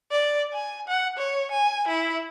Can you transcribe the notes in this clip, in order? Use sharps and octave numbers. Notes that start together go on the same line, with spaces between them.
D5
G#5
F#5
C#5
G#5
E4